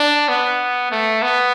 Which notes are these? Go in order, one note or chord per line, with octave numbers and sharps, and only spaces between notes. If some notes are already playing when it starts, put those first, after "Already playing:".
Already playing: D4
B3
A3
B3